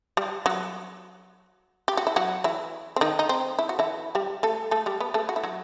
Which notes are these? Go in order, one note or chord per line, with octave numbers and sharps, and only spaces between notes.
G3 G4
F#3 F#4
G4
F#4
E4
F#3 F#4
E3 E4
C4
D#3 D#4
D#4
C4
E4
F#4
E3 E4
G3 G4
A3 A4
A3 A4
G3 G4
B3 B4
A3 A4
F#4
E4
F#3 F#4